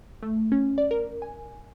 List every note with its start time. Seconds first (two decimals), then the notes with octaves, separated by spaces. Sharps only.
0.23 A3
0.52 C#4
0.78 D5
0.91 A#4
1.22 G#5